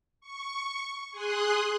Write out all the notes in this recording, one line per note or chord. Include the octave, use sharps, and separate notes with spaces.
C#6
G#4 C6 D#6 F#6